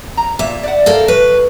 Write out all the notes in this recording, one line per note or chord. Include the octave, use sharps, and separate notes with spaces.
A#5
A#2 E5
D5 F#5
A4 A#4 F5
F#3 B4